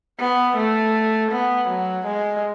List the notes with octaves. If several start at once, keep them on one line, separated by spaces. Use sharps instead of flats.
B3
A3
B3
F#3
G#3